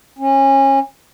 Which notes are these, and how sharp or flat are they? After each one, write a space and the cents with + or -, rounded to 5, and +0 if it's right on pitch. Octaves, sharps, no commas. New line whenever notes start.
C#4 -25